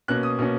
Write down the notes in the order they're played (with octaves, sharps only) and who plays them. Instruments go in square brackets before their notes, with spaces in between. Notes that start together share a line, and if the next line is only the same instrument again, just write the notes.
[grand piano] B2 A#3 C#4 F#6
D#6
B2 A#3 C#4